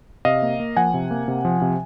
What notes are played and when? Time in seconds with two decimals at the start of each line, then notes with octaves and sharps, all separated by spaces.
0.25 C3 D#5 F5
0.43 A#3
0.60 A#3
0.76 F3 F#5 G#5
0.94 C3
1.11 A#3
1.28 C3
1.45 F3
1.62 C3